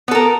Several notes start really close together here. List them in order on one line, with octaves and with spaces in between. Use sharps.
B3 A4 A#4